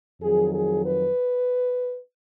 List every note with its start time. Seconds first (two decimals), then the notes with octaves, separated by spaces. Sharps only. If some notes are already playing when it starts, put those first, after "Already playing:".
0.21 F2 D#3 F#3 G#4
0.54 G#4
0.85 B4